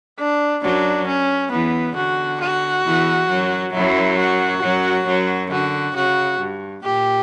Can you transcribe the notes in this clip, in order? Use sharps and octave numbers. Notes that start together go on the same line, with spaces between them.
D4
F#2 F#3 D4
C#4
E2 E3 B3
D3 F#4
F#4
E2 E3
F#2 F#3
F#2 F#3 E4
F#4
F#2 F#3
F#2 F#3
D3 F#4
C#3 F#4
G2
A#2 G4